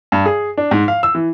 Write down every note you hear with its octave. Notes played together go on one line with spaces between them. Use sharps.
G2
G#4
D4
G#2
F5
E6
E3